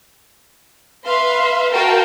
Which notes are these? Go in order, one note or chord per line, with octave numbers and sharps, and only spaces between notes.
B4 E5 F5 C6
F#4 A#4 F5 G5 A5